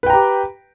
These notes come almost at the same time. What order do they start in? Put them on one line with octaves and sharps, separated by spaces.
B4 G5 A#5 G4